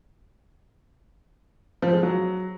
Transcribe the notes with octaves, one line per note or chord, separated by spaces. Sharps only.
F3
G#3
F#3